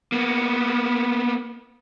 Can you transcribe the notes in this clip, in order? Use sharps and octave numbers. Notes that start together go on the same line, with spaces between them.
A#3 B3